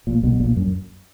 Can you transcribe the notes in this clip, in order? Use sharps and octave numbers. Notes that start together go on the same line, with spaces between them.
A#1 A#2
B1 B2
A#1 A#2
F#2